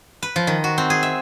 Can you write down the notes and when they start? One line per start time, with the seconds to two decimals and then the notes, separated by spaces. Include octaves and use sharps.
0.23 B4
0.36 F3
0.47 D#3
0.64 F#4
0.78 C4
0.90 G#4
1.03 E5